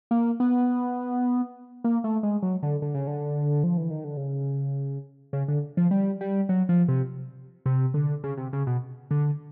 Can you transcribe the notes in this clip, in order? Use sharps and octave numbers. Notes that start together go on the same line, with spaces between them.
A#3
B3
A#3
A3
G#3
F#3
D3
D3
C#3
D3
F3
E3
D#3
D3
C#3
C#3
D3
F3
G3
G3
F#3
F3
C3
C3
D3
C#3
C3
C#3
B2
D3